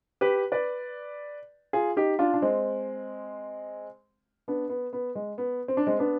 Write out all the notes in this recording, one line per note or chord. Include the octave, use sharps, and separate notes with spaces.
G4 B4
B4 D5
F4 G#4
D#4 G4
D4 F4
D4
G#3 C4
B3 D4
B3
B3
G#3
B3
C4
D4
G#3 C4
B3 D4